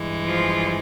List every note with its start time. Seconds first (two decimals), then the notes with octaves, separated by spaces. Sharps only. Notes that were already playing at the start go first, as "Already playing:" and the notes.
Already playing: G2 E3 G#3
0.25 F3 F4